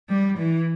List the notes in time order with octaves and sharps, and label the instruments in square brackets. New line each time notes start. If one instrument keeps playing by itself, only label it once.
[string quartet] G3
E3